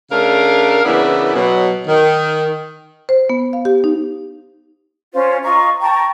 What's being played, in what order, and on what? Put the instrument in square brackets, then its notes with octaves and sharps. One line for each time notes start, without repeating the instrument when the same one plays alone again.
[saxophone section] C#3 A3 D4 A#4 F5
C#3 E3 A#3 B3 D4 E4
B2 F#3
D#3
[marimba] C5
B3
F5
G4
D#4
[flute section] C#4 F4 C5
F4 D#5 A#5 C#6
G5 A5 A#5 C#6